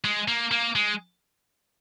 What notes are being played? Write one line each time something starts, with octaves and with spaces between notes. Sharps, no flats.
G#3
A#3
A#3
G#3